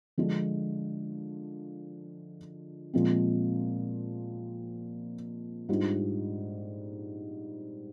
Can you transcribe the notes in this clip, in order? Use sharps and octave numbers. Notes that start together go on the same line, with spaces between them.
D3 F3 G#3 D4 F4
A#2 F3 G#3 C4
G#2 G3 D4 F4